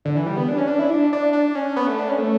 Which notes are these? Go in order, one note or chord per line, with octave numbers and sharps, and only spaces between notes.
D3
E3
G3
B3
D4
C#4
D4
E4
D4
D4
D4
C#4
B3
A3
D4
C#4
A3